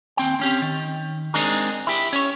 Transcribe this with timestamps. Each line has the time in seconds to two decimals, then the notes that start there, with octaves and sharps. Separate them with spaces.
0.17 D#2 C4 G5
0.40 C4 C#4 G4
0.62 D#3
1.34 G#3 C4 D4 D#4 G#4 A#4
1.87 E4 G4
2.13 C#4 C#5